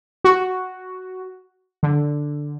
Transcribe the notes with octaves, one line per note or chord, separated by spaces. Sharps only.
F#4
D3